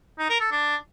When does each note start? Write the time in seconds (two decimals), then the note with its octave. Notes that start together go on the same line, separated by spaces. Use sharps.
0.18 D#4
0.29 A#4
0.40 A4
0.51 D4